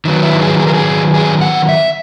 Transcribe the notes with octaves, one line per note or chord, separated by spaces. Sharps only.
D#3 F#3 B3
E4
G#4
G#4
A#4
G#4
G#4
F#5
E5